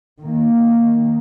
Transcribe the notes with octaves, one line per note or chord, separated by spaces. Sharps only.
D#3 A#3